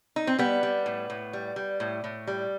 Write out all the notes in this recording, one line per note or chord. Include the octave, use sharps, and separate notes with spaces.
D#4
C4
G3 B3
G3
A2
A2
G3
G3
A2
A2
G3